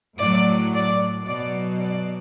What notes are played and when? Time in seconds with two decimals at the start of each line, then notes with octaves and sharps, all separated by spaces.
0.18 A2 F#3 D5
0.73 D5
1.26 B2 F#3 D5
1.80 D5